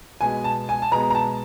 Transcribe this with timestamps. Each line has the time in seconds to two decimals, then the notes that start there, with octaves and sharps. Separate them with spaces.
0.21 B2 G#3 B3 G#5
0.44 A5
0.69 G#5
0.82 A5
0.91 B2 G#3 B3 A#5
1.10 A#5
1.15 A5